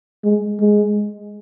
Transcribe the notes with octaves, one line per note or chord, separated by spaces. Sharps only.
G#3
G#3